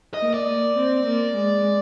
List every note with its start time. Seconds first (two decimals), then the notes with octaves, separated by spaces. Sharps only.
0.14 D#5
0.20 A#3
0.34 D5
0.48 A#3
0.77 C4
1.06 A#3
1.34 G#3